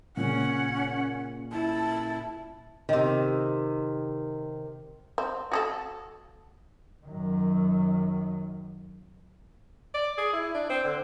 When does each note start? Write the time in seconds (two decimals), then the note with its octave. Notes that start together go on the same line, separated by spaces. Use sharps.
0.17 A#2 C#3 C#4 F#5
1.52 E4 A5
2.89 C3 D#3
5.18 C4
5.52 F#4 G#4 A4
7.06 F#2 D#3
9.94 D5
10.18 G#4
10.33 E4
10.54 D4
10.69 C4
10.84 D3